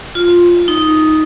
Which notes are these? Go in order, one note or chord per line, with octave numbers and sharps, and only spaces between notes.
F4
D#4